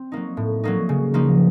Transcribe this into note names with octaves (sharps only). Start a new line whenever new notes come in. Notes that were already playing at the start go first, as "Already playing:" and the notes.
Already playing: C4
F#3 A#3 D#4
A2
F#3 A#3 D#4
C#3
F3 A#3 D#4